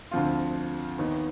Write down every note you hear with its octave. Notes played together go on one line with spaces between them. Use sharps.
D2 D3 F3 C4 F4
D#2 D#3 B3 D#4